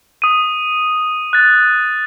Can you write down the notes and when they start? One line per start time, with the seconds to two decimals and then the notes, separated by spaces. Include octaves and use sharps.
0.22 D#6 D#7
1.33 F#6 A6